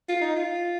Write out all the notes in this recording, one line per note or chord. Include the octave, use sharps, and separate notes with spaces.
F4
D#4
F4